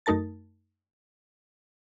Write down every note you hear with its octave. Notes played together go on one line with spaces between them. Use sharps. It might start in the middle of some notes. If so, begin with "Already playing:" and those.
F#2 A3 D#4 A#4 A5 A6